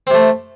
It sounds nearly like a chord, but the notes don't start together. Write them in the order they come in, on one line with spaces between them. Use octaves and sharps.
C4 C3 A3